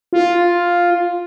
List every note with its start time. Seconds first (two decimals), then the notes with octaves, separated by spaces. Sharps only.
0.13 F4